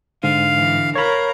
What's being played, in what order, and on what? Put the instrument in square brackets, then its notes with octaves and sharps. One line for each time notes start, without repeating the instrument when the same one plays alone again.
[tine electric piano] G#2 [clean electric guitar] D3 [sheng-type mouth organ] F5
[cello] E3
[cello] A#4 F5 [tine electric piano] C#5 B5